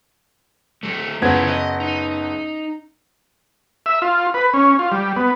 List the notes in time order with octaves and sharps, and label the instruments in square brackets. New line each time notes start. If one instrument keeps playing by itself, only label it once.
[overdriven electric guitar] F#3 A3
[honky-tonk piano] F#1 B3 G#6 [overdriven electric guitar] E3 F4
[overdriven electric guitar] D#5
D#4
[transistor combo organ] E5
F4
B4
C#4
F4
G3
B3